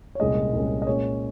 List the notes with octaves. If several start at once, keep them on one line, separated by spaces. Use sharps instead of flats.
C#5
C2 A#2 G#3 C#4 D#5
C2 A#2 G#3 C#4
D#5
A#2 G#3 C#4 C#5